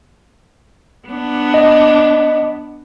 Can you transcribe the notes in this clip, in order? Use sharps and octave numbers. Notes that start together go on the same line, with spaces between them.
B3 D4
D#5